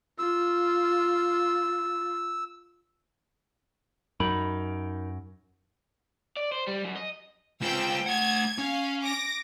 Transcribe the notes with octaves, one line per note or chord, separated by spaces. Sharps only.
F4 E6
F#2 D#4 A#4 B5
D5
C5
G3
F#2
D#5
G#3 C4 F4 G5 E6
A3 F#5 G#6
C#4 F5
D6 A#6